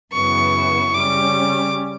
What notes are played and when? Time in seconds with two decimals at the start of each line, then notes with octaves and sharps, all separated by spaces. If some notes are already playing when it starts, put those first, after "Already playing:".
0.13 F#2 C#3 E3 B3 E4 C#6
0.94 C#3 G3 C#4 D6